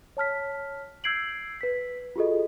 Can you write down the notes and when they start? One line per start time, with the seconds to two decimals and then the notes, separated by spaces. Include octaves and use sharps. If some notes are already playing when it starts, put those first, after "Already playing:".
0.17 C#5 A5 F6 B6
1.04 E6 G6 G#6 C7 D7 F#7
1.61 B4 B6
2.16 F4 F#4 G#4 A4 D#5